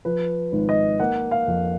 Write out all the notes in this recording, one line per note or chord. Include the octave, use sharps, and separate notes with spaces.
F3 B4
G#1
D#5
A#3 F#5
F5
F2